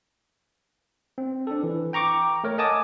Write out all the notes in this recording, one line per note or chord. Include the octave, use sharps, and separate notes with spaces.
C4
D4 A4
E3
G5 A#5 C#6 D6
A3 A#4 C#5
D#5 F#5 G#5 A5 D6 D#6